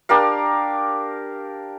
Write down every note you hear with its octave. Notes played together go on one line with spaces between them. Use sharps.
D4 G4 A#4 F5